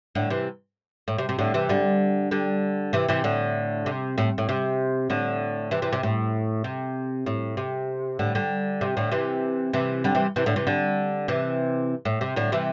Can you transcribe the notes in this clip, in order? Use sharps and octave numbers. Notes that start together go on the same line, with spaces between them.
A2 D3
C3 E3
A2
C3
C3
A2 D3
C3 E3
D3 G3
D3 G3
C3 E3
C3 E3
A2 D3
C3
A2
A2
C3
A2 D3
C3 E3
C3 E3
C3
A2
C3
A2
C3
A2 D3
D3 G3
C3
A2 D3
C3 E3
C3 E3
D3 G3
C3 E3
C3 E3
A2 D3
C3 E3
D3 G3
C3 E3
A2
C3
A2 D3
C3 E3